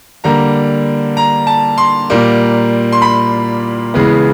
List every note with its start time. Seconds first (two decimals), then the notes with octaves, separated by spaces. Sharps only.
0.24 D3 G3 A#3 A#5
1.17 A#5
1.47 A5
1.78 C6
2.10 A#2 G3 A#3
2.92 C6
3.02 B5
3.94 C#3 E3 G#3 B3